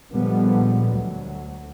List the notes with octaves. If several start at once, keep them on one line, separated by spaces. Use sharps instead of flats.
A#2 D3 F3 G3 G#3 B3
D2 F#3